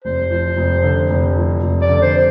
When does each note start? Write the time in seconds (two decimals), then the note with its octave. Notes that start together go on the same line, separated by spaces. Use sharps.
0.04 F1 C5
0.30 F2
0.57 F1
0.83 D3
1.10 F1
1.37 F2
1.62 F1
1.82 D5
1.89 D3
2.02 C5